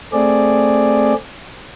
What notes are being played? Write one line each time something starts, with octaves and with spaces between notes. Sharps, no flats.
A3 C4 G#4 D5